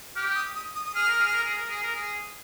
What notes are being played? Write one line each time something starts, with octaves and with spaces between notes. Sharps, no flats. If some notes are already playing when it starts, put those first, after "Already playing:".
G4 F6
D#6
D#6
D#6
D#6
G#4 F6
A#4
G#4
A#4
G#4
A#4
G#4
A#4
G#4